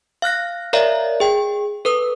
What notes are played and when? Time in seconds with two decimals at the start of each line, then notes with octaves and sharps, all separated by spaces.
0.22 F5 F6 F#6 A#6
0.73 A#4 C#5 D5 E5 F5 A#5
1.20 G#4 G5
1.85 A4 B4 D#6